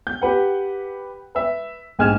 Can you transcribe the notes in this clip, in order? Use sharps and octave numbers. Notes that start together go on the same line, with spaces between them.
G6
G4 B4 F#5
B4 E5
A#1 G#2 G#5 F6 G#6 E7